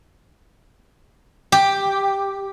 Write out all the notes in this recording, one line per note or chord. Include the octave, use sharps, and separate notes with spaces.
G4